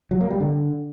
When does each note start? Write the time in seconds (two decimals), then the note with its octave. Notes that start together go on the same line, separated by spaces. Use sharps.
0.11 F#3
0.21 A#3
0.30 G3
0.40 D3